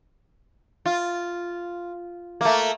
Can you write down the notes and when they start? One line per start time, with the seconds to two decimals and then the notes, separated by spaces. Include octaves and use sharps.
0.86 F4
2.41 A3 A#3